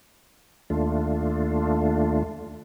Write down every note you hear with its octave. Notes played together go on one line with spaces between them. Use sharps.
D#2 A3 D4 F4